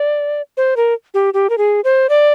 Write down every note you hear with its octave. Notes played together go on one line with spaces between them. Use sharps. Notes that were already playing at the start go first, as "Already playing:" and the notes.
Already playing: D5
C5
A#4
G4
G4
A#4
G#4
C5
D5